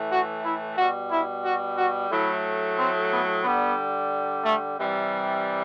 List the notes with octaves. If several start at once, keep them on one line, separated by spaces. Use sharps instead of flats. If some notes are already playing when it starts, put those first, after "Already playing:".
Already playing: A2 E3 A3
F#4
E4
B2 G3 F#4
E4
F#4
F#4
A2 F#3 A3 E4
C4
B3
D3 G3 B3
A3
C3 E3 G3